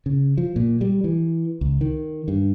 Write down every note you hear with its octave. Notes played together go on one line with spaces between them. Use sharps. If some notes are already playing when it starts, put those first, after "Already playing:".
C#3
F3
A#2
G3
E3
C#2
D#3
G2